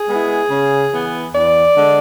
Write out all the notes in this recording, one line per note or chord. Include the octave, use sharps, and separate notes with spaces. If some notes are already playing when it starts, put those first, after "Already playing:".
Already playing: G#4
G#3 B3 E4
C#3
E3 B3
E2 D5
D3 G#3